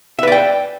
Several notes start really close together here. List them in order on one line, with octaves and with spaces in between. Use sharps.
E5 B4 D5 G5